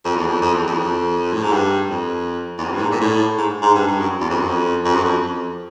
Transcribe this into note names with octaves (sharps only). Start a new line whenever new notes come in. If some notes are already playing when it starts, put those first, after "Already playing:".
F2
E2
F2
F2
E2
F2
E2
F2
A2
G#2
G2
F2
E2
F2
G2
A2
G#2
A#2
A2
G#2
G#2
G2
G2
F#2
E2
F2
F#2
F2
F2
F#2
F2
F2